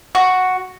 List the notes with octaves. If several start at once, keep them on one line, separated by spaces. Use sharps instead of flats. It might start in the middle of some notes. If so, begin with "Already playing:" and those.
F#4